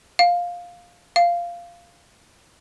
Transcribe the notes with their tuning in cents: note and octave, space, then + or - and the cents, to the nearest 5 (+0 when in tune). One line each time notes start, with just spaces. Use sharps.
F5 +10
F5 -10